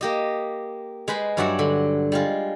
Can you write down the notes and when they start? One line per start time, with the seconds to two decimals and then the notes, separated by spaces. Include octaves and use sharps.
0.01 A#3 G4 D#5
1.08 G#3 B4 C5 B5
1.37 G2 F#3 F#4 D5 E5 F#5
1.59 D3
2.12 G3 G#3 F4